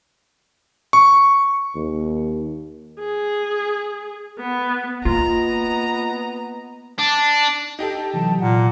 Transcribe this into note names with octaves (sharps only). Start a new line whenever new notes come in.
C#6
D#2
G#4
B3
A#3 B3 F4 D#5 A#5
D4
D#4 G4 A4 D#5
C3 E3 F#3 A5
A#2 F#5